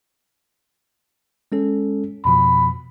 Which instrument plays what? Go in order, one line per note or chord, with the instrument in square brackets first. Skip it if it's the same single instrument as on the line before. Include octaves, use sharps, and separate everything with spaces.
[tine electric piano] G#3 C#4 A4
[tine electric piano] F2 B2 F3 [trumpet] B5